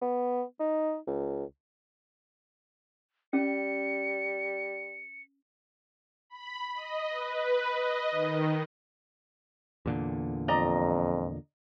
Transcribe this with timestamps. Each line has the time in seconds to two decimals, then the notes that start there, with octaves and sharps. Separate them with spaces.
0.01 B3
0.60 D#4
1.07 C#2
3.33 G3 C#4 C#7
6.30 B5
6.74 D#5
7.10 B4
7.72 D#5
8.11 D#3
9.86 E2 A#2 D3
10.48 F2 D5 D#5 A#5